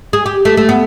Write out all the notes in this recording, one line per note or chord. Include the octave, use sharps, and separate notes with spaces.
G#4
G4
A3
A3
B3